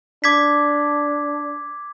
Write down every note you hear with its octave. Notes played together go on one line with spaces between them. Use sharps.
D4 D6 G#6 B6